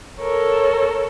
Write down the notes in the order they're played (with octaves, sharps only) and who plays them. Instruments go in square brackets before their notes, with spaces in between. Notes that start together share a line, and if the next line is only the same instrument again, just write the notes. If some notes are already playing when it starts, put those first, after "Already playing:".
[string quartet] A4 A#4 C#5